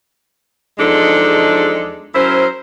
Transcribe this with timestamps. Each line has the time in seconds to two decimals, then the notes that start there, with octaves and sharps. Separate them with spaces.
0.79 E2 F3 G#3 D4 D#4 A4
2.14 F#3 C#4 E4 A#4 C5